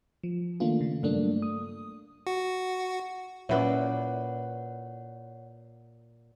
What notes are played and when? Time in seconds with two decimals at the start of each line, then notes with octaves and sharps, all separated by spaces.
0.24 F3
0.60 D#3 A3 A#3 D4 F4
0.81 C#3
1.03 G2 F#3 A3 A#3 D4
1.42 D#6
2.27 F#4
3.49 A#2 C#4 E4 B4 C#5 D5 E5 F#5